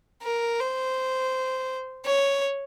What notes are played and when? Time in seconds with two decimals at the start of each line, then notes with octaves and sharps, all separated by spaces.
0.23 A#4
0.59 C5
2.05 C#5